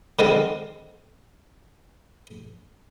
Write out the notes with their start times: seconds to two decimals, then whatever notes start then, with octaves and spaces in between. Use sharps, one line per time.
0.19 D3 D#3 G#3 C4